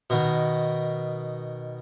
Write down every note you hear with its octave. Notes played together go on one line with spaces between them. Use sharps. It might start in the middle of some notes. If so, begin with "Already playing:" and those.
B2 D#3